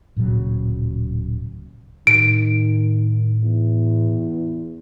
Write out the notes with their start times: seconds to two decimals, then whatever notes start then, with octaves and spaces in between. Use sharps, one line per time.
0.16 D1 A#2 C#3 F#3
2.07 A2 D#3 D7
3.42 E2